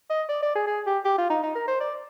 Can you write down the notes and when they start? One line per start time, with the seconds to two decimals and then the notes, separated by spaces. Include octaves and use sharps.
0.10 D#5
0.29 D5
0.42 D5
0.55 G#4
0.67 G#4
0.86 G4
1.05 G4
1.18 F4
1.30 D#4
1.43 D#4
1.55 A#4
1.68 C5
1.80 D5